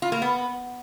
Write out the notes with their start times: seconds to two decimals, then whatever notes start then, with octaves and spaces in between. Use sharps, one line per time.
0.02 F4
0.12 A#3
0.22 B3